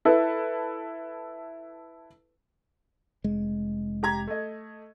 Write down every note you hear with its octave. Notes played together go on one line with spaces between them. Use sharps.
E4 A4 B4
F1 G#3
G4 A#5 G#6
A3 D#5